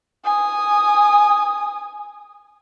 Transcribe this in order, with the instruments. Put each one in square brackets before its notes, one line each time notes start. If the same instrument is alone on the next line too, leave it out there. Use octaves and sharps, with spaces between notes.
[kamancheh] G#5 D#6